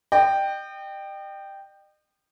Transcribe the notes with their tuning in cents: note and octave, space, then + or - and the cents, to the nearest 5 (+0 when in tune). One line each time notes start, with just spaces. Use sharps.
D#5 -40 G5 +0